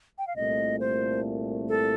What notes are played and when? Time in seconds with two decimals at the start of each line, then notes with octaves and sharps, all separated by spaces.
0.18 G5
0.27 F5
0.36 C2 A#2 A3 D#5
0.80 C5
1.69 A4